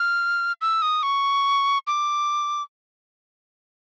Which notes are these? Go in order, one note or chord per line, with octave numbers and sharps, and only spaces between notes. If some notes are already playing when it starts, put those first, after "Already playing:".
Already playing: F6
E6
D#6
C#6
D6